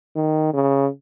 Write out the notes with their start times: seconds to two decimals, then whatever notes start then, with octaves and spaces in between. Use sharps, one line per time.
0.16 D#3
0.53 C#3